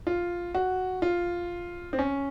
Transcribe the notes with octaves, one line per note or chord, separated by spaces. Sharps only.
F4
F#4
F4
C4
C#4